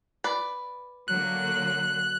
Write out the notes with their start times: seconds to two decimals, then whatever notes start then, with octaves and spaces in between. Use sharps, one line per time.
0.24 B4 D5
1.08 D3 F#3 A#3 F#6